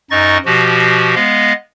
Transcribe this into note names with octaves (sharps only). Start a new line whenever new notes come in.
F#2 D#4 D#5 C#6 A6
B2 F3 F#4 G4
G#3 B3 D#5 F5